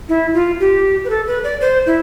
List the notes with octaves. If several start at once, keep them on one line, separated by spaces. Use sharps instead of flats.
E4
F4
G4
B4
A4
B4
D5
C5
E4